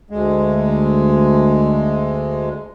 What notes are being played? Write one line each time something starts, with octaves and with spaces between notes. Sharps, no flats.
D2 G#3